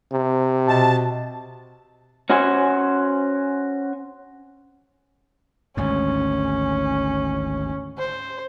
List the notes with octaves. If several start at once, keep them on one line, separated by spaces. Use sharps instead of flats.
C3
B2 A5
C#4 F#4 C5 G#5
G#1 D2 G#2 C#4
C5